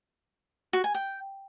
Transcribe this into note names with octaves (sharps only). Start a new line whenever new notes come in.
F#4
G#5
G5